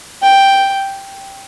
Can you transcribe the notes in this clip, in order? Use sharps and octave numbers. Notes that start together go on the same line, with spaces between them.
G5